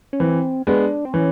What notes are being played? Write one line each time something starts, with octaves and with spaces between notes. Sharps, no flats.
C#4
E3 C4
G#3 B3 D4
C4
E3 C#4